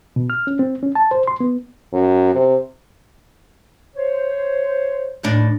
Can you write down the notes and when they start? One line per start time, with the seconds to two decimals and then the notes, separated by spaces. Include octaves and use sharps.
0.16 B2
0.30 F6
0.47 C#4
0.59 C4
0.83 C#4
0.95 A5
1.11 C5
1.28 C6
1.40 B3
1.93 F#2
2.35 C3
3.96 C5 C#5
5.23 D#2 A2 D4